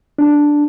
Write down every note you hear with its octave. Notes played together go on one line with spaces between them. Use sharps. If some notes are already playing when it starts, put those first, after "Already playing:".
D4